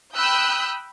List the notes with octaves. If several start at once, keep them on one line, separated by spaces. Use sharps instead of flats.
G5 B5 D#6 E6 F#6 G6